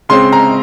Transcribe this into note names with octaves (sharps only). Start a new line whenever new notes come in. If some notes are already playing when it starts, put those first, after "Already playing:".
C#3 G#3 C4 C6
A#5